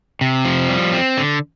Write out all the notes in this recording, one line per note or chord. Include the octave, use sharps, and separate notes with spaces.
C3
F3
G3
C4
D3